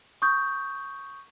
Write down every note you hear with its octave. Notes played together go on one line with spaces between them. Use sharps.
C#6 D#6 G6